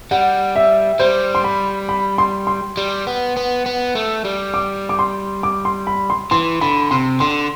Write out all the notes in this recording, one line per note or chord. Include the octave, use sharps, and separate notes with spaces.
G3 F#5
E5
G3 C5
C6
B5
B5
C6
C6
G3
B3
B3
B3
A3
G3
D6
D6
C6
D6
C6
B5
C6
E3 C6
D3 B5
C3 C6
D3 C6